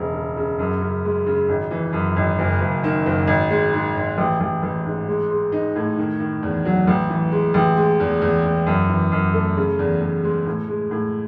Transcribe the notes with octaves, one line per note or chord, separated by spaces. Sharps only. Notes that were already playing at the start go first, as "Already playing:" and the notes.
Already playing: E1 C#3
C#3
C#3
F#2
C#3
G#3
C#3
G#1
E3
F#2
G#1
F#1
F#1
D#3
F#1
G#1
G#3
G#2
G#1
A1
A1
A1
G#2
G#3
G#3
D#4
A2
D#3
D#3
E2
F#3
A1
E3
G#3
A1
G#3
E2
E2
E2
F#2
E3
F#2
A3
C#3
E2
E2
G#3
A2
G#3
A2